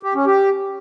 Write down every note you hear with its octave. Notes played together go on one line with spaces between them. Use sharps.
G4
C#4
G4